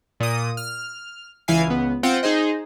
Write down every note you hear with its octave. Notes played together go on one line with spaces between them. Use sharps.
A#2 D#6
F6
C#2 E3 E4 F5 G#5 C7
C#2 B3
C4 F4 F#5 G5
D#4 G#4 C5 D#5